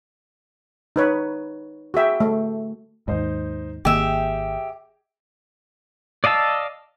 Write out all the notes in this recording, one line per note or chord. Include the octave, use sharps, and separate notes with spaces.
D#4 B4 C#5
F#4 G#4 E5 G5
A3
D#2 G#2 D#4 C5 D#5
G#1 D#3 A#3 G4 G#4 D#5 E5 G5
D5 D#5 F5 A5 E6